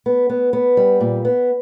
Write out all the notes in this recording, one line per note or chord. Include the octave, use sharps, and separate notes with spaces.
B3
B3
B3
G3
A#2
B3